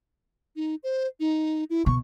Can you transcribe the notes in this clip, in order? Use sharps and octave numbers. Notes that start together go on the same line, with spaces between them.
D#4
C5
D#4
E4
B2 C#6